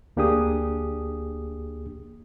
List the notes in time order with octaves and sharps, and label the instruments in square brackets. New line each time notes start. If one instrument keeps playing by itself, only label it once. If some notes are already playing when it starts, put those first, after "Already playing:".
[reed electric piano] D2 A#3 D4 G4 G#4 D#6